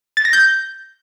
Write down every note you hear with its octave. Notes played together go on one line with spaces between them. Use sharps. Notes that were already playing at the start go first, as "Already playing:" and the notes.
A6
A#6
G6